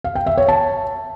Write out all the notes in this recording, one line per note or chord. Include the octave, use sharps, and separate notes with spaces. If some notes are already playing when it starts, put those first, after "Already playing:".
F5
G5
E5
C#5
A5